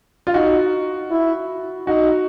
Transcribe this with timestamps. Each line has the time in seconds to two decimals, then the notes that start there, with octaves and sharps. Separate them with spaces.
0.27 F4
0.34 D#4 F#4
1.11 E4
1.87 D#4 F#4